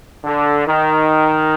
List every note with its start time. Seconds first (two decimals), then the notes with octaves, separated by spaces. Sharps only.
0.24 D3
0.67 D#3